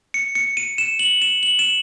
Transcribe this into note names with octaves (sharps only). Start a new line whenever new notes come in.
C#7
C#7
D#7
E7
F#7
E7
F#7
E7